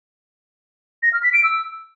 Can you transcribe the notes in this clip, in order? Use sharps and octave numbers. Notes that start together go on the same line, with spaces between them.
A#6
F6
B6
D7
E6